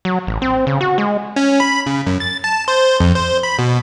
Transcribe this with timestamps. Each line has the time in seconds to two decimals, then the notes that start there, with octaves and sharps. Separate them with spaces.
0.05 F#3
0.27 A1
0.42 C4
0.67 C#3
0.81 F#4
0.98 G#3
1.36 C#4
1.60 B5
1.86 C#3
2.07 F#2
2.20 A6
2.44 A5
2.68 C5
3.00 F2
3.15 C5
3.43 B5
3.59 B2